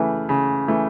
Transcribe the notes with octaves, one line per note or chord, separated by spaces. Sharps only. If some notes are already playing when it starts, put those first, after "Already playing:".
Already playing: C#3 E3 A3
C#3
E3 A3